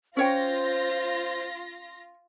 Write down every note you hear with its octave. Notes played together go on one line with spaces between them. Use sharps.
C#4 F4 C5 C#5 G5 A#6